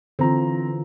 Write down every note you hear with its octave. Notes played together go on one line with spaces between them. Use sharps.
D3 E3 C4 F4 A#5